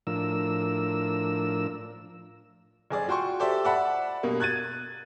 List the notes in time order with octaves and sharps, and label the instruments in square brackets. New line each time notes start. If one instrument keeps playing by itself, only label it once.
[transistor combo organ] A2 F3 D4 A#4 E6
[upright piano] F#1 G#4 D5
F4 F#4 G5 C6 C#6
G4 A4 C5 D5 E5
D5 E5 F#5 A5 B5
G2 B2 A#3
F#6 G#6 A6 D#7